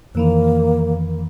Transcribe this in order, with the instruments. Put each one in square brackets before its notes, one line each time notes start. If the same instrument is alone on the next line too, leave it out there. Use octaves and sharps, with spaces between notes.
[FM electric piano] F2 D#3 E3 [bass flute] A#3